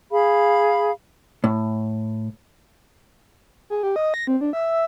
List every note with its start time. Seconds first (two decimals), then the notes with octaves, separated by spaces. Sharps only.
0.11 G#4 F5 B5
1.44 A2
3.70 G#4
3.83 G4
3.96 D#5
4.14 A#6
4.27 C4
4.41 D4
4.53 E5